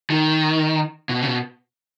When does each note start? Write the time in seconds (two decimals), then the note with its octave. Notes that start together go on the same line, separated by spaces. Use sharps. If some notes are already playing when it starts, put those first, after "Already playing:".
0.10 D#3
1.09 B2
1.21 C#3
1.26 B2